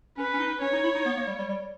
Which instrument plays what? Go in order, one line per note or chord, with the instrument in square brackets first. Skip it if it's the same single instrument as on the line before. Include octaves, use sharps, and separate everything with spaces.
[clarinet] C#4 [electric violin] B4
[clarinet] C#4
D#4
[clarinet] C#4 [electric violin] C#5
[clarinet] D#4
E4
D#4
B3
A#3
G3
G3
G3